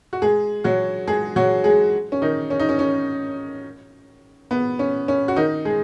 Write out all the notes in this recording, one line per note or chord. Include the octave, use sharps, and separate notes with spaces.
F#4
G#3 G#4
F#3 F#4
G#3 G#4
F#3 F#4
G#3 G#4
C#4
D#3 D#4
C#4
D#4
C#4
C#4
B3
C#4
C#4
F#4
D#3 D#4
G#3 G#4